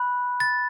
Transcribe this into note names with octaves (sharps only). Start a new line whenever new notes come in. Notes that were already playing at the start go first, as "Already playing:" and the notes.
Already playing: B5 F#6
A6